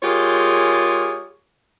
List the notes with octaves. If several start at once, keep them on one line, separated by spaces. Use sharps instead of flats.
G#3 F4 G4 G#4 A#4 C#5